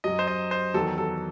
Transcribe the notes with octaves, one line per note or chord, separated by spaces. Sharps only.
F#2 F#3 D#5
C5
D#5
C5
E2 D#3 F#3 A4
A4